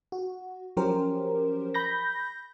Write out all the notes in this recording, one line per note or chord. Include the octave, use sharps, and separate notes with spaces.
F#4
F3 F#3 C#4 G4 A#4 C5
B5 G6 A#6